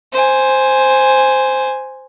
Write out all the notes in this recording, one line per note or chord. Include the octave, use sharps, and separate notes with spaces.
C5 G#5